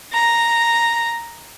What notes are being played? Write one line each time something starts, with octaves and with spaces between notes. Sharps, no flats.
A#5